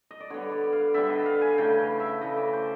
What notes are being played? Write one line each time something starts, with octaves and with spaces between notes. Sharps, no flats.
D#5
D5
D3 G3 B3 C#5
D5
F5
D3 G3 B3 E5
D#5
F5
G#5
C#3 E3 A3 G5
F5
E5
C#3 E3 A3 D#5
D5
C5